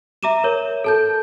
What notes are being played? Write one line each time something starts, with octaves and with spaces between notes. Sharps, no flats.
E5 A#5 D6 D#7 E7
A#4 C#5
A4 A5 G6